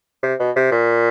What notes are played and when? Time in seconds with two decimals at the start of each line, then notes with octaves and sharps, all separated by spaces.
0.23 C3
0.39 B2
0.56 C3
0.72 A#2